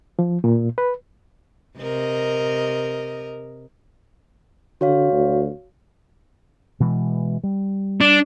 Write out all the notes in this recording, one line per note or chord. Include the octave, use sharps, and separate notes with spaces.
F3
A#2
B4
C3 A#4 D#5
D3 F#4 C#5 F5
D2
B2 E3 G#3
G3
D4